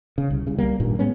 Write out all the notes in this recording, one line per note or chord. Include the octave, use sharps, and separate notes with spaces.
C#3
C2
C2 C#3
G3 A#3
G#1 G2 A#2 D#3
A2 G#3 B3 C#4